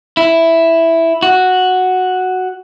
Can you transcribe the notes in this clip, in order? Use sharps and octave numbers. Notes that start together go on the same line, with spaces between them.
E4
F#4